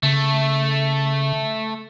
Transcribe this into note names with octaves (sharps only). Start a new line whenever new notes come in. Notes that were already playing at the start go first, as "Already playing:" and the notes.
C#3 A3